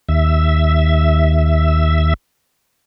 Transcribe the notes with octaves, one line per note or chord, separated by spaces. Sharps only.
D#2 E5